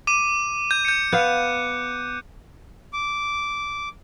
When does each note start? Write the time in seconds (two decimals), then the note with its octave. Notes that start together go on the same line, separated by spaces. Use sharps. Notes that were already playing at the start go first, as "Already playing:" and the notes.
0.07 D6 D#7
0.71 G6
0.85 G6 C#7
1.12 B3 F5 F#6
2.93 D6